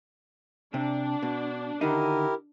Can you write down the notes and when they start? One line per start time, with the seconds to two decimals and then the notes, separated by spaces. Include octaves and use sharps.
0.74 C3 D4
1.23 B2
1.81 D3 D#3 D#4 E4 G4 A#4